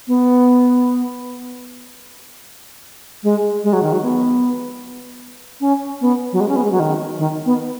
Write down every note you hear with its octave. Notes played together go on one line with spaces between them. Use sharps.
B3
G#3
G#3
F#3
D#3
F#3
B3
C#4
B3
F#3
G#3
C#4
B3
G#3
F#3
D#3
D#3
B3